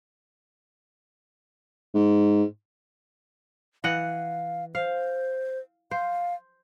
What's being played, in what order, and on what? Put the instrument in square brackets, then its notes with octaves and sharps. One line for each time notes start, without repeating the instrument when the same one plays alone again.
[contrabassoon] G#2
[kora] E3 D#5 F#5 [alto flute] F5
[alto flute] C5 [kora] F5
[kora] C5 [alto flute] F5